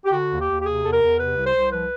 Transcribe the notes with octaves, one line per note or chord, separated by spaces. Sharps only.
G4
D3 F#4
D#2
G4
D#2
G4
C3 G#4
E2 A4
A#4
E2
C3 B4
C2
C5
C2
F3 B4